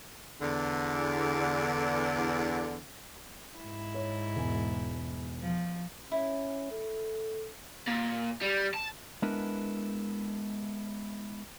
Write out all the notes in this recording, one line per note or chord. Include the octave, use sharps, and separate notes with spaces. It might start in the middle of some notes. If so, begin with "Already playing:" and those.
E2 D3
G#2 E4
C#5
E1
F3
C#4 E4
A4
A#2
G3
A5
G#3 B3 D4 E4 A#4 B4